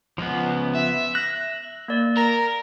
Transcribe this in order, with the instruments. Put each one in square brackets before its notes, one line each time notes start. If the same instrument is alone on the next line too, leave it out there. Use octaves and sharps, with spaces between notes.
[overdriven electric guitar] C#2 [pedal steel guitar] F3 B3
[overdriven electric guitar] E5
[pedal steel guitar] F#6 [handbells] A#6
[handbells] A#3 D5
[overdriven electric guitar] A#4 [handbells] A#5 A#6